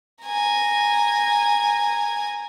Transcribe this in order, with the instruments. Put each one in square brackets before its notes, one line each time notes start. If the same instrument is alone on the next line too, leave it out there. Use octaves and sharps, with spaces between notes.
[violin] G#5 A#5